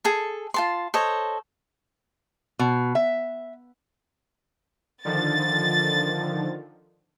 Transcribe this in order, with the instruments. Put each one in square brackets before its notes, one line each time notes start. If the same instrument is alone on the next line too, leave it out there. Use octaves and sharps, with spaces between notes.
[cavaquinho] G#4 A4 A5
F4 A5 C6
A4 C5 C#5 D#5
[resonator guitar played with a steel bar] B2
E5
[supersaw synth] D3 D#3 F3 [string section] A6